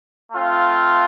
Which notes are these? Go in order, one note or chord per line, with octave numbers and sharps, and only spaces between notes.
A3 C4 F4